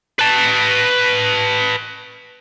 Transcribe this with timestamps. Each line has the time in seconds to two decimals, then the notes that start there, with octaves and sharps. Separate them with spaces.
0.19 B4 A5